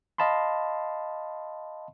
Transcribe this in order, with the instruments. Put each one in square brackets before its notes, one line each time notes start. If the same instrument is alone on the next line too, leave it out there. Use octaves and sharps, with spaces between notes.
[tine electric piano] D#5 F5 A5 B5 C6